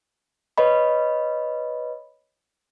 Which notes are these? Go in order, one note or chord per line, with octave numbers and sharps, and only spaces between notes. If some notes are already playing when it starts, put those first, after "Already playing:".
B4 C#5 D#5 B5